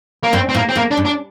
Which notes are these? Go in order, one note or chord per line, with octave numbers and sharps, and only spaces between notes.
A#3
G2 C4
C4
A2 A#3
C4
A2 A#3
D4
G2
D4